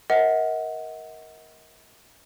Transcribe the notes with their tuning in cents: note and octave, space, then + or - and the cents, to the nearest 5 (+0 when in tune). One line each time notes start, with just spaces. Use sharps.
A#4 +10 D#5 +40 F#5 +0